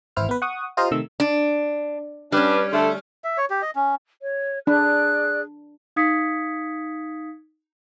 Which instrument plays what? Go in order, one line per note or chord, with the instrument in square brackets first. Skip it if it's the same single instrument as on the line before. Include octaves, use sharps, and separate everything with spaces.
[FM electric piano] G#1 E3 E4 C5 F6
B3 B4
F#5 C#6 D#6
F4 G4 C5 D#5 F5 A#5
C3 D#3 A3 E6
[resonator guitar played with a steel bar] D4
[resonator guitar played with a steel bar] G3 C#4 [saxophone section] D4 B4
[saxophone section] D3 A3 A4
[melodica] E5
C#5
G4
D#5
C#4
[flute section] C#5
[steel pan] D4 B5 [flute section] G#4 D5 F#6
[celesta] D#4 F5 D#6 G#6 B6 C#7